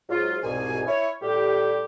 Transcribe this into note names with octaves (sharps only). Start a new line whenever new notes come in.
G#2 F#3 F4
C2 G#2 B2 G#5
E4 C#5
A2 G3 G4